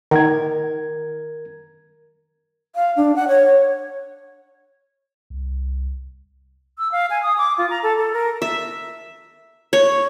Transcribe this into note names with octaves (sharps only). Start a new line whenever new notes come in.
D#3 A#4 G#6
F5
D4
F#5
C#5
C2
E6
F5
G#5
D#6
D6
F4
A#5
A4
A4
A#4
E5
C#5